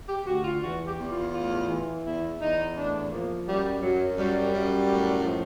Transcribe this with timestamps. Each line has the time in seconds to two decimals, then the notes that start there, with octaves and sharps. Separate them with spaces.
0.08 G4
0.25 D2 F#4
0.44 F4
0.62 E2 F#4
0.86 G4
0.98 E2
1.09 F4
1.33 A2 F4
1.68 E3
2.04 E2 E4
2.40 E2 D#4
2.76 A2 D4
3.11 F3 A#3
3.47 F#2 G3
3.82 F#2 F#3
4.18 F#2 G3
4.53 F#2
4.90 A2
5.24 F3